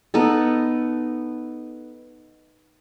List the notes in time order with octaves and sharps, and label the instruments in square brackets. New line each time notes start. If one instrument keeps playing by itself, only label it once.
[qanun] B3 D#4 A4